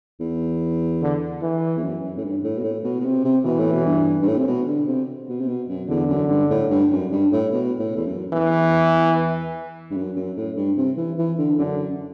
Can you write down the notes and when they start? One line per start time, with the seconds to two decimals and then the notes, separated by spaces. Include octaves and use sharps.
0.20 E2
1.02 D3
1.42 E3
1.77 E2
1.82 F#2
2.03 F#2
2.17 A2
2.23 G2
2.44 A2
2.58 B2
2.64 A2
2.84 B2
3.00 B2
3.05 C3
3.24 C3
3.45 B2 E3
3.59 A2
3.72 B2
3.86 G2
4.22 G2
4.27 A2
4.38 C3
4.47 B2
4.67 D3
4.88 C3
5.29 B2
5.40 C3
5.48 B2
5.69 F#2
5.89 E2 D3
6.09 F#2
6.30 G2
6.50 A2
6.70 G2
6.91 F#2
7.12 G2
7.32 A2
7.52 B2
7.79 A2
7.96 E2
8.06 F#2
8.32 E2 E3
9.91 G2
9.96 F#2
10.16 F#2
10.37 A2
10.57 G2
10.77 C3
10.97 E3
11.18 E3
11.38 D3
11.58 F#2 D3